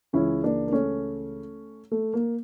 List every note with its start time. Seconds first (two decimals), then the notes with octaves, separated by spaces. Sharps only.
0.13 C#2 C#3 E3 C#4 E4
0.43 A#3 D4
0.67 A#3
0.72 A3 C#4
1.91 A3
2.14 A#3